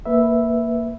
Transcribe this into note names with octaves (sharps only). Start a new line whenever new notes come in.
A#3 B4 E5